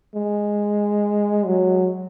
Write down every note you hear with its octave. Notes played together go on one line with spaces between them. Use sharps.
G#3
F#3